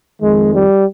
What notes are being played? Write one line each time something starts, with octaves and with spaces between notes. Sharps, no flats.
F2 D#3 G#3
G3